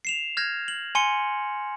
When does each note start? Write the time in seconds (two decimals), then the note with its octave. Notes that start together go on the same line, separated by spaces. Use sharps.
0.05 C7 E7 F7
0.37 F6 G6 G#6 A#6
0.68 F#7
0.95 G#5 C6 C#7